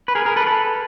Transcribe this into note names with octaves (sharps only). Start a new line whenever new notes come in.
B4
G#4 A#4
G#4 A#4
A4 B4
A4 B4